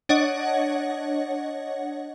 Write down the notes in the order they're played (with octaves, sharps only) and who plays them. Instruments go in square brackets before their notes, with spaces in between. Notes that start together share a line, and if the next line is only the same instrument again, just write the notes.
[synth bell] D4 C#5 D#5 F#5